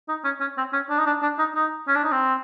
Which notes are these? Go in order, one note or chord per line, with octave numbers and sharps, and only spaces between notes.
D#4
C#4
C#4
C4
C#4
D4
D#4
D4
D4
D#4
D#4
C#4
D4
D#4
C4